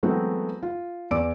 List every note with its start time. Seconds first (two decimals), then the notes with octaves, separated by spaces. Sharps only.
0.03 E3 F#3 G#3 A3 B3 C4
0.63 F4
1.11 E2 D5 D6 E6 D7